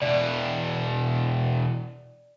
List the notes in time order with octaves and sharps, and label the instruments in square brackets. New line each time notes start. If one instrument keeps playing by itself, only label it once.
[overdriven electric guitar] E2 B2 [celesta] D5